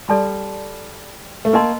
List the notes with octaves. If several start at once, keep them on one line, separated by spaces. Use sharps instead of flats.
G3 A4 D5 A5 C6
A3
A#3 A#4 D#5 A5 C6